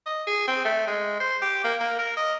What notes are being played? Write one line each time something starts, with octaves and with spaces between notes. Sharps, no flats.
D#5
G#4
C4
A3
G#3
C5
G4
A#3
A#3
A#4
D#5